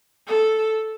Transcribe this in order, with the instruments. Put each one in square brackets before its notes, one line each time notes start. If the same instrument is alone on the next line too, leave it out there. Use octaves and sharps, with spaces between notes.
[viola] A4